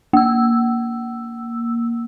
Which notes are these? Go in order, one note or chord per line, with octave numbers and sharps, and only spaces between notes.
A#3 E6